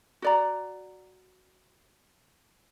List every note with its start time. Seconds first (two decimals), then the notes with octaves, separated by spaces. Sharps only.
0.22 F#4 D5 A#5